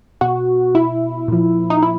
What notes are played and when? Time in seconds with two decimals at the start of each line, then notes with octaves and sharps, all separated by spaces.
0.21 B2 F#4
0.75 E4
1.28 A#2 F3
1.70 D#4
1.82 E4